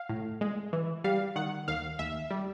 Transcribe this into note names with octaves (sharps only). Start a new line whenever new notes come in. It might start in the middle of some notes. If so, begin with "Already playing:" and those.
Already playing: F5
A2
G#3
E3
G3 F5
D#3 F#5
D#2 F5
D#2 E5
G3